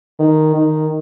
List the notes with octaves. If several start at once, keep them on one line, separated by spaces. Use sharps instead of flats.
D#3
D#3